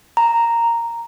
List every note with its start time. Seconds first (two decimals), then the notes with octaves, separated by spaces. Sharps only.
0.17 A#5